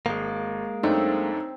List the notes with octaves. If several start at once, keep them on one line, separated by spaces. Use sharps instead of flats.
G#1 G#3 A#3
F#2 A3 C4 D4 D#4